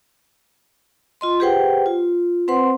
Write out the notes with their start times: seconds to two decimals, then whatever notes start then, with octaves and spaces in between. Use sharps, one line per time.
1.21 F4 D#5 C6
1.40 G4 G#4 B4 C5 F#5 G5
1.86 F4
2.48 C4 B4 C5 F#5 C6